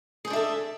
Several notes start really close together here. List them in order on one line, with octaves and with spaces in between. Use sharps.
G#4 C5 D4 E5 A4